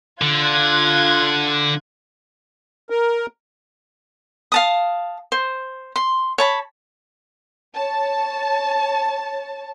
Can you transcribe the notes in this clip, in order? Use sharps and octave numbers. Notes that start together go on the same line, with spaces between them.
D3 F4 F#6 G#6
A#4
F5 A5 D#6
C5
C6
C#5 A5 B5
C#5 A5